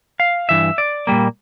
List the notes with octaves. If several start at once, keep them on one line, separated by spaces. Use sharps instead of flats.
F5
G2 E3 E5
D5
A#2 G3 A#3